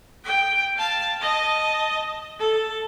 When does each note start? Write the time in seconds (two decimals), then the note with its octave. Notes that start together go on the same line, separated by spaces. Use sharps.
0.24 G5
0.77 F5 A5
1.21 D#5 A5
2.40 A4